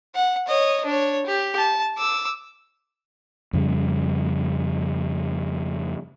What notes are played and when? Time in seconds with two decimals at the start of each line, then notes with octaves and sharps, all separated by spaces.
0.15 F#5
0.48 C#5 D#5
0.85 D4 C#5
1.26 G4
1.58 A5
1.98 D6 E6
3.53 F2 C#3 G3